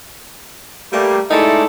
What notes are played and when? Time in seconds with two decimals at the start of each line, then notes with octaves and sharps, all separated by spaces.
0.92 G3 A3 A#3
1.30 G#3 A3 D#4 E4 A4 D5